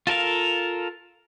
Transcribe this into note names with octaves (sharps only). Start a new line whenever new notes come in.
F4 A4 A#4 F5